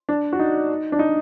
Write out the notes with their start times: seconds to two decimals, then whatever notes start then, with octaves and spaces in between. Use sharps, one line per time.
0.09 D4
0.33 F#4
0.39 D#4
0.92 D4
0.99 D#4